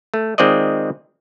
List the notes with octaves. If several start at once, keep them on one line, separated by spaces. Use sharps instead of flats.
A3
D#3 G#3 C4 F4 D5 D#5